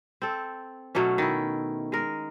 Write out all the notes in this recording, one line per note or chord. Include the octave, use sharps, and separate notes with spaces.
C4 A4
B2 F#3 A3 C#4
D#3 E4
G#3 A#4